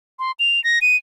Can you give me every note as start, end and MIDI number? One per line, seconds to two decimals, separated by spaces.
0.19 0.32 84
0.39 0.62 101
0.64 0.79 94
0.81 0.96 99